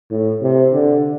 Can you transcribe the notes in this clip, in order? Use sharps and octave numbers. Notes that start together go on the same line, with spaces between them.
A2
C3
D3